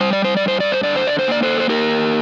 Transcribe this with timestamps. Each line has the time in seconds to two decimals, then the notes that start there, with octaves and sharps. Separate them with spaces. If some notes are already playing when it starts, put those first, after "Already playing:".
0.01 G3 C5
0.13 D5
0.24 C5
0.37 D5
0.44 G2 C5
0.60 D5
0.72 C5
0.83 D3 D5
0.96 C5
1.07 D5
1.19 C5
1.28 A#3 D5
1.43 A4 C5
1.60 C5
1.69 A#3 G4 A#4